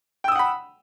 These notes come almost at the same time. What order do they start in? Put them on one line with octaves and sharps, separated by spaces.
G5 E6 D#6 F#5 B5